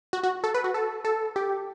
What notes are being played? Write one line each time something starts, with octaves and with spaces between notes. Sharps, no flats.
F#4
F#4
A4
B4
F#4
A4
A4
G4